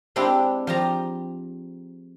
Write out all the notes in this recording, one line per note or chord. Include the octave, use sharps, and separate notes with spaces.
G#3 C4 D4 E4 G4
F3 G4 A#5